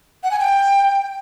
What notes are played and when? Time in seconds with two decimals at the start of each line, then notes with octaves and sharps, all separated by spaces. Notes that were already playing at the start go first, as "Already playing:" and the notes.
0.24 F#5
0.31 G#5
0.39 G5